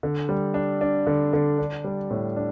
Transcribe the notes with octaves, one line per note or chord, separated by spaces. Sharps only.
D3
G3
D4
D4
D3
D3
D4
G3
A2
D4